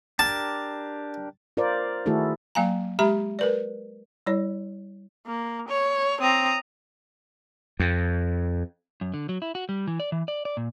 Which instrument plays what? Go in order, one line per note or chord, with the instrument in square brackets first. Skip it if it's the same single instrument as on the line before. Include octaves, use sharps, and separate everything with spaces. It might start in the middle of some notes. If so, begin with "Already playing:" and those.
[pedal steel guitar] D4 G4 A#4 [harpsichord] A5
[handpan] F4 A#4 C5 D5
D#3 A3 E4 F#4 G#4 A4
[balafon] F#3 A#3 F5 G#5 A#5
G#3 G4 E5 A#5 B5
A#4 B4 D5
G3 E4 C#5 D5
[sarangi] A#3
C#5
[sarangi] C4 [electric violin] A#5 D#6
[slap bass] F2
[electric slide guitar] F#2
D3
F#3
E4
F#4
G3
E3
D5
E3
D5
D5
A#2